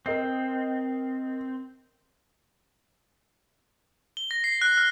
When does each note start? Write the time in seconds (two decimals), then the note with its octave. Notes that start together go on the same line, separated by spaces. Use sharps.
0.06 C4 A#4 D#5 C7
4.17 G7
4.31 A#6
4.44 C7
4.61 F#6
4.78 F6